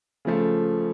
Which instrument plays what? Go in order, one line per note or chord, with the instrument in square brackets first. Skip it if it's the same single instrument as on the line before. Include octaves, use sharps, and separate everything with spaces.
[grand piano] C#3 F3 A3